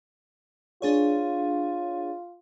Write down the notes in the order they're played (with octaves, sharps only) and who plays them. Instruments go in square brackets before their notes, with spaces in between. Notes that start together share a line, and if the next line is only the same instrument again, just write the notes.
[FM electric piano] D4 G#4 C#5 [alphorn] F4